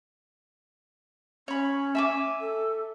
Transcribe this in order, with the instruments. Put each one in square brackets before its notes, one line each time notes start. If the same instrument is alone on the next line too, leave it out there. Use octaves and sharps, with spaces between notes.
[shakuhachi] C#4 [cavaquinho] C#5 B5
[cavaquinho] E5 G#5 D6
[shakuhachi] A4